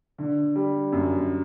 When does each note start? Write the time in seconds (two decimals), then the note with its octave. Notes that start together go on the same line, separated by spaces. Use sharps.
0.18 D3
0.55 G3
0.92 F#2